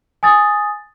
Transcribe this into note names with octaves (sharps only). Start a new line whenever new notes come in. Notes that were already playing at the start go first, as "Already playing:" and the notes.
G#5 D#6 A6